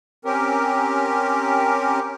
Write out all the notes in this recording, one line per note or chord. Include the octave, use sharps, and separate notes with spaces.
C4 C#4 G4 A#4